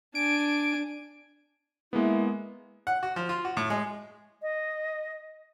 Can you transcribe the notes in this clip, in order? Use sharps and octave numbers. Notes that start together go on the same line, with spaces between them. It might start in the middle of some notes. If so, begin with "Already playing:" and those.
D4 G#5 D7
G#3 A#3 B3 E4
F#5
F#4
F3
F4
F#4
A2
G#3
D#5